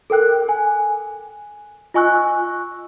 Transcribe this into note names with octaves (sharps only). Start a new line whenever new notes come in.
A4 A#4 G5 F#6
G#5
F4 D#5 G#5 C#6 E6 F#6